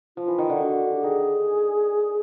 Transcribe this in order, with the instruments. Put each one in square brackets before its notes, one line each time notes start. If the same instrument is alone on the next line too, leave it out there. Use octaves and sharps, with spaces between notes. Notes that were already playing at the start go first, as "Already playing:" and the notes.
[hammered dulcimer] F3 [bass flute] F4
[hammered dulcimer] E3
D#3
D3
[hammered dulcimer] D3 [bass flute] F#4
[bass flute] G4
[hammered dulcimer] D#3 [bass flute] G#4